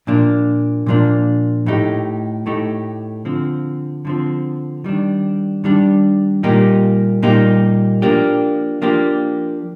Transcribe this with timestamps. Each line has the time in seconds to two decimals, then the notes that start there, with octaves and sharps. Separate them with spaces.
0.07 A#2 F3 A#3 D4
0.86 A#2 F3 A#3 D4
1.66 A2 A3 D#4 G4
2.46 A2 A3 D#4 G4
3.25 D3 F3 C4
4.05 D3 F3 C4
4.84 D#3 G3 D4
5.64 D#3 G3 D4
6.43 A#2 G3 A#3 D#4 G4
7.22 A#2 G3 A#3 D#4 G4
8.02 F3 A#3 D4 G4
8.82 F3 A#3 D4 G4